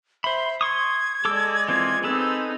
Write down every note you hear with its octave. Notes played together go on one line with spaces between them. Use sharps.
C5 E5 B5
C6 C#6 D#6 G#6
G#3 A4 D5 D6 E6
E3 C4 F4 G#6
C4 D#4 G#4 A4 B4 E6